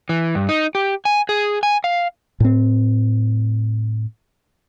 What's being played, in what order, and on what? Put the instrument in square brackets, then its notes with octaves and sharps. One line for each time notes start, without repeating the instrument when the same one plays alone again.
[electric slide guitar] E3
G2
D#4
G4
G#5
G#4
G#5
F5
[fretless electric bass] A2 C4